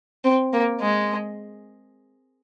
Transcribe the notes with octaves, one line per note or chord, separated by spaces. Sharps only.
C4
A#3
G#3